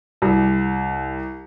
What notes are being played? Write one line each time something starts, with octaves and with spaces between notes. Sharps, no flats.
C2